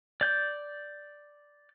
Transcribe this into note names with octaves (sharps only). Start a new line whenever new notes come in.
D5 G6